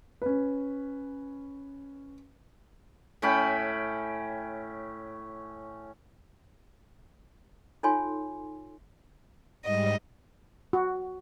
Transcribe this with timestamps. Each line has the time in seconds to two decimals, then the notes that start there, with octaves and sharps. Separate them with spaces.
0.22 C#4 B4
3.22 A2 C#4 G5 B5
7.83 D#4 F4 A4 C#5 G#5 C6
9.64 G#2 G3 D#5
10.73 F#4